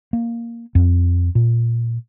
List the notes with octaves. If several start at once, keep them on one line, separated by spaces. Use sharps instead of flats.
A#3
F2
A#2